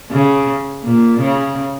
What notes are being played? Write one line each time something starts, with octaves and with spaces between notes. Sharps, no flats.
C#3
A#2
C#3